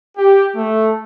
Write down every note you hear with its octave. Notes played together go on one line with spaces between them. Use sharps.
G4
A3